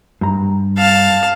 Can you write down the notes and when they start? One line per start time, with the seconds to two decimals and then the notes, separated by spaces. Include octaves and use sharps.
0.21 G2 A#5
0.78 F5 A5